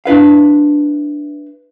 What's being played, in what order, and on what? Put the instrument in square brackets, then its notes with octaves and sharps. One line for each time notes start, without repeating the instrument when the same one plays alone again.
[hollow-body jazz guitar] D4 E4 B4 F5